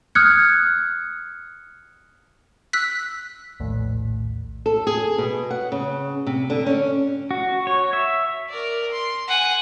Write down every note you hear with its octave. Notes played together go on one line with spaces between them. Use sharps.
D#6 F6 F#6 G#6 C#7
E6 F#6 B6
A#1 D#2 A2
A4
G#4
B2
F#5
C#3
C3
D3
C#4
F#4
C#5
E5
A#4 D5
C6
F#5 G#5